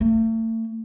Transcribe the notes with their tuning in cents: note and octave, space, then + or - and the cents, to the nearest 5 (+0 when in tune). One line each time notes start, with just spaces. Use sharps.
A3 +35